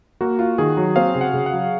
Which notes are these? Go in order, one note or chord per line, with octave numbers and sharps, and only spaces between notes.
A#3 F#4
F4
D#3 G#4
F#3
C4 F5
C#3
F#5
C#3
F#5
F#3